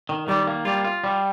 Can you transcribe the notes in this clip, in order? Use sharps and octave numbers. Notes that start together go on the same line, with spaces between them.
D#3
D#3 G3
A#3
G3 F4
F4
G3